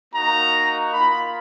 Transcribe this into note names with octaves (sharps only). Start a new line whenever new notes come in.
A#3 D#4 F#4 A#5
A#3 F4 B5